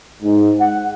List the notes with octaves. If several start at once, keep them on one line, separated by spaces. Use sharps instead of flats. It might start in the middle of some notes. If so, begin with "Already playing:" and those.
G#2
F#5